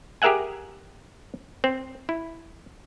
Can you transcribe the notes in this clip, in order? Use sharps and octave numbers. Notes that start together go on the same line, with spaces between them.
G4 G#4 A#4 E5 F#5 G#5
C4
E4